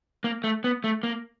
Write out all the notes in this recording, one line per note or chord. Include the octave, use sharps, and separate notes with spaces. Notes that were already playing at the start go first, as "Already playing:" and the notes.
A#3
A3
B3
A3
A#3